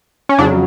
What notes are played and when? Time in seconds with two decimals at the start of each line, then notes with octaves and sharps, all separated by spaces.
0.29 C#4
0.38 F2 C#3 F#3 D4